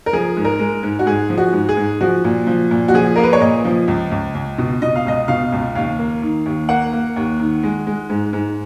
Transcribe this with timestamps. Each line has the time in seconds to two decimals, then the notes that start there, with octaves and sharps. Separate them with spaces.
0.06 A#4
0.13 F3 G#4
0.37 G#2
0.45 A#4
0.59 G#3
0.83 G#2
0.99 F#4
1.06 G#2 G#4
1.30 F3
1.38 F#4
1.53 G#2
1.69 G#4
1.77 G#2
2.01 F3 F#4
2.24 A#2
2.47 F3
2.71 A#2
2.88 F#4
2.94 F3 G#4
3.16 A#3 A#4
3.23 B4
3.33 C#5
3.41 A#2 D#5
3.65 F3
3.88 C#2
4.11 C#2
4.35 C#2
4.58 B2
4.82 B2 D#5
4.96 F5
5.06 C#2 D#5
5.28 B2 F5
5.52 C#2
5.75 D#2 F5
5.99 A#3
6.22 D#3
6.46 D#2
6.69 A#3 F#5
6.93 A#3
7.16 D#2
7.40 D#3
7.63 G#3
7.87 G#3
8.10 G#2
8.33 G#2